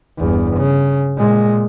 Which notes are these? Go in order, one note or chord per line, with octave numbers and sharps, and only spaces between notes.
G1 E2
C#3
A#2 G#3